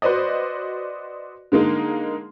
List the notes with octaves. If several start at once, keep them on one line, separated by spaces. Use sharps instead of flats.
F#4 B4 C5 D5 D#5
D3 G#3 A#3 D#4